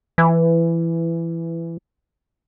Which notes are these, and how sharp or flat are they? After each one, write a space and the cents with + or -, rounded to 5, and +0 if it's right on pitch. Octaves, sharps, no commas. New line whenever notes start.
E3 +15